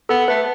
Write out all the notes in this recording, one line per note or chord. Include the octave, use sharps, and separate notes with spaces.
B3 A4
A3 B4